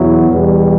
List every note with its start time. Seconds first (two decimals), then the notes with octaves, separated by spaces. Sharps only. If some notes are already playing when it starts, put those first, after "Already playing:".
Already playing: E2 B2 F#3 B3 E4
0.29 E2 B2 G3